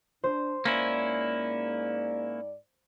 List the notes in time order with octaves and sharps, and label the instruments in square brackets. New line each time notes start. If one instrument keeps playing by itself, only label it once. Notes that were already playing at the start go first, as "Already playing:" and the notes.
[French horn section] D4 [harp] C5
[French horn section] G#2 D5 [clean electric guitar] A#3 C#4 E4